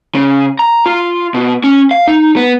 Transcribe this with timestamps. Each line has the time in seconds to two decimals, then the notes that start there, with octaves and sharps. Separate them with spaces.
0.15 C#3
0.59 A#5
0.86 F4
1.34 B2
1.64 C#4
1.91 F5
2.08 D#4
2.36 B3